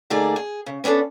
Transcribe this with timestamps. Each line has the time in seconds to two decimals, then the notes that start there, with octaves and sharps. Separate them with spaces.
0.10 D3 A3 A#3 D#4 G#4 D5
0.36 G#4
0.66 C#3
0.84 B3 C#4 D4 G4 A4